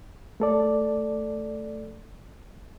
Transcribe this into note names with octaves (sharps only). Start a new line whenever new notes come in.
A3 A4 D5